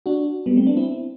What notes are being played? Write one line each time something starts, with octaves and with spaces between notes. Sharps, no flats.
D4 F#4
G3 B3
A3 C4
B3 D4
C4 E4